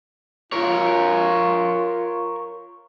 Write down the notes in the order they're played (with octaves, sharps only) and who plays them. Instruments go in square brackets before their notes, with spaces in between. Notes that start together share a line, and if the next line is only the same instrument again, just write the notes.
[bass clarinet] F4 [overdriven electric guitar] A#4 C#5